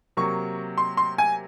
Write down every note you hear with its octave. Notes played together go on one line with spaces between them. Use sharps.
C3 F#3 A#3 C#6
C6
C6
G#5